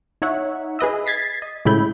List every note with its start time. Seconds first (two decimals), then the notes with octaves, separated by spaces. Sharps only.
0.22 D#4 C#5 E5 F#5
0.79 G#4 B4 D#5 E5
1.06 G#6 A6 B6 C7
1.42 D#5
1.65 A2 C#3 G#3 E4 B5 G6